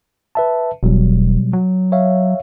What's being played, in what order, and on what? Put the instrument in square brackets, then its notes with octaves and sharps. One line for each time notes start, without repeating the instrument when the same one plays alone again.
[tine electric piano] B4 E5 A5
[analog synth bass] E1 [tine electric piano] B2 F#3 G3
[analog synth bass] F#3
[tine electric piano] C#5 E5 F5